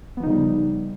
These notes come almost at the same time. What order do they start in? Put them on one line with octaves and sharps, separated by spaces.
B3 F3 D#4 C#3 G3